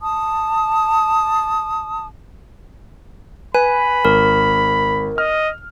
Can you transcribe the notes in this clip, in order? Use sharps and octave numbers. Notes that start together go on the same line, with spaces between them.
A5 D#6
B4 G#5 B5
G#1 A#4
D#5 F6